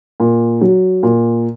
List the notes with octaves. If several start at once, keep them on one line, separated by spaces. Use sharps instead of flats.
A#2
F#3
A#2